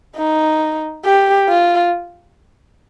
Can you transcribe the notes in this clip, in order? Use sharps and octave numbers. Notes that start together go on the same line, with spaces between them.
D#4
G4
F4